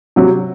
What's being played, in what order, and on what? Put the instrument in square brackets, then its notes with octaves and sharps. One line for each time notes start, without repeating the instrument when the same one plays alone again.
[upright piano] C3 F#3